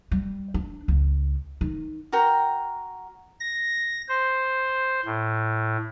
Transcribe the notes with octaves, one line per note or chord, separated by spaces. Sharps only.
G3
D4
C#2
D#3
F#4 A#4 G5
A#6
C5
A2